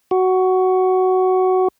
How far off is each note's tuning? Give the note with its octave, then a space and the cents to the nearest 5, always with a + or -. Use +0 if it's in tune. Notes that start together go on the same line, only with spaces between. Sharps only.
F#4 +10